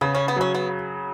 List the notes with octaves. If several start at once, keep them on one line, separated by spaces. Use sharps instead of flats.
C#3 B3
C#4
B3
F#3 C#4
B3